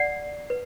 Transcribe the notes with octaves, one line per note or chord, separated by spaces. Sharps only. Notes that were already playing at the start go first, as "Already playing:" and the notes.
Already playing: D5 F#5
B4